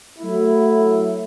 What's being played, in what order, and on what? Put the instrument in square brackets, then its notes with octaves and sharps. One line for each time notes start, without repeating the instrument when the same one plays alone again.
[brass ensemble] F#3 A3 E4